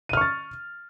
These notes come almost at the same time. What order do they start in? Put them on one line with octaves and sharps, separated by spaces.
D#7 F6 C#6 A6